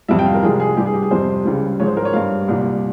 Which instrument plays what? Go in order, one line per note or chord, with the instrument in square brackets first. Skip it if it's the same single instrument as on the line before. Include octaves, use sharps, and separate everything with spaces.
[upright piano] F2 C3 G3 E5
G5
F5
A#4
C2 C3 F3 G#3 G#4
G#4
G2 G3 G4
G#4
G4
G#4
F2 C3 G3 C5
C#2 C#3 G3
G#2 F3 G#3 C#5
C5
A#4
C#5
G2 G3 F5
C2 A#2 G3